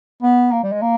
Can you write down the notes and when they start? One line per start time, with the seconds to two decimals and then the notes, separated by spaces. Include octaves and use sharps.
0.23 B3
0.52 A#3
0.63 G3
0.72 G#3
0.82 A#3